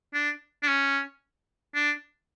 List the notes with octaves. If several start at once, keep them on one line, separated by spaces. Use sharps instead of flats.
D4
D4
C#4
D4